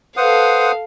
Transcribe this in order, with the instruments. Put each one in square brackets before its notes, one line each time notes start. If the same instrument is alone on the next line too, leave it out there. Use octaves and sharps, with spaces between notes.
[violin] A4 F5 [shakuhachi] B4 [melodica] C5 F#5 D#6